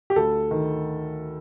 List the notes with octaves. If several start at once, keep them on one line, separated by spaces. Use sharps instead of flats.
G4
D2 A4
D#3